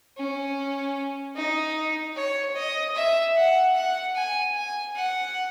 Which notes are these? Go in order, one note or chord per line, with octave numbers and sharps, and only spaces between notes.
C#4
D#4
C#5
D#5
E5
F#5
F#5
G#5
G#5
F#5